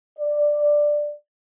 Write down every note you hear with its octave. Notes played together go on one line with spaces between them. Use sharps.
D5